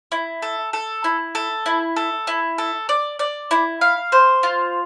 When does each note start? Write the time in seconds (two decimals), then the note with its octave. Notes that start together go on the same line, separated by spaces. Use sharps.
0.12 E4
0.42 A4
0.73 A4
1.04 E4
1.35 A4
1.66 E4
1.96 A4
2.27 E4
2.58 A4
2.89 D5
3.19 D5
3.51 E4
3.81 F5
4.12 C5
4.43 F4